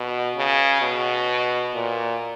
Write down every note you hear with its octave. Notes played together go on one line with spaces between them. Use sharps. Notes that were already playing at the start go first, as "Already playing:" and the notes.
Already playing: B2
C#3
B2
A#2